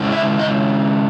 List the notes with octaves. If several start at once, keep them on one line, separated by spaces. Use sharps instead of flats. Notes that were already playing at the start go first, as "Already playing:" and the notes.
Already playing: C#3 G#3 C#4 E4
E5
D#5